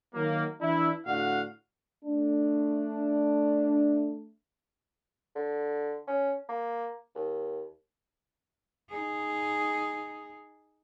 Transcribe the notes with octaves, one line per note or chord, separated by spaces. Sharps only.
D#3 F#3 A#3
E3 D4 E4
A2 D3 F#4 F5 F#5
A3 D4
D3
C#4
A#3
D#2
D#4 G#4